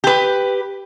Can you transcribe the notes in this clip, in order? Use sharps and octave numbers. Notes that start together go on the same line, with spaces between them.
G4 B4